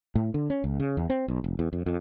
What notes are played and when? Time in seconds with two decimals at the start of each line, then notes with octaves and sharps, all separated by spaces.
0.15 A2
0.34 D3
0.50 C#4
0.64 C#2
0.80 C#3
0.97 E2
1.10 C4
1.28 B1
1.44 F1
1.59 E2
1.73 F2
1.86 F2